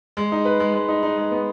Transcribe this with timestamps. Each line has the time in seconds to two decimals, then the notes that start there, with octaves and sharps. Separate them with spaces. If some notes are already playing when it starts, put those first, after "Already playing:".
0.17 G#3
0.32 D#4
0.45 B4
0.60 G#3
0.74 G#3
0.88 D#4
1.03 D#4
1.18 G#3
1.31 B3